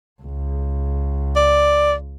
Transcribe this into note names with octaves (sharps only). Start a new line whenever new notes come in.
C#2
D5